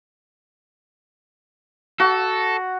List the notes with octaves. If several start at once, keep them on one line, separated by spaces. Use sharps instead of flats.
F#4 A4